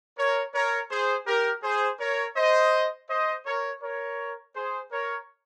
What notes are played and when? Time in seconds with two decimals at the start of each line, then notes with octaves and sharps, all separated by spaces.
0.17 A#4 C#5
0.54 A#4 C#5
0.90 G#4 C5
1.27 G4 A#4
1.63 G#4 C5
1.99 A#4 C#5
2.36 C5 D#5
3.09 C5 D#5
3.46 A#4 C#5
3.82 A#4 C#5
4.55 G#4 C5
4.92 A#4 C#5